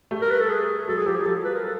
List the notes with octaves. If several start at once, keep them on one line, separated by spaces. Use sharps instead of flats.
G3 A3
A#4
B4
A4
G#4
F#3 G#3 A4
G#4
F3 G3 G4
G#4
F3 G3 A4
B4
A#4
A4